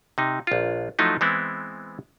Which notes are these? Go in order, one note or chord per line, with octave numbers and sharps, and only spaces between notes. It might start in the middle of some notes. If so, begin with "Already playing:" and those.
C3 D#4
A#1 F4
F3 F#3 A3 D#4 E4
E3 G#3 B3 C4 E4